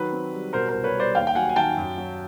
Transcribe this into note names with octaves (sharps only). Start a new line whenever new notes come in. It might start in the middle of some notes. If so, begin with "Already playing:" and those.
Already playing: D#3 F#3 B4
C4
G3
B2 A#4 C5
A#4 C5
C2
B4 C#5
G3
C5 D5
D#2 F5 G5
G5
F#3 F#5 G#5
G#5
D#3 G5 A5
F#2
F#3